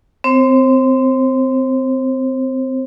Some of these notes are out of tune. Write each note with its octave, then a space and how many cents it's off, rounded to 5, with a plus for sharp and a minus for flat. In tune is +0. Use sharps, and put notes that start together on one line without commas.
C4 -20 C5 +35